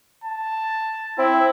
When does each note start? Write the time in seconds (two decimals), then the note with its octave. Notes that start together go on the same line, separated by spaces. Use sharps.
0.24 A5
1.18 C4 E4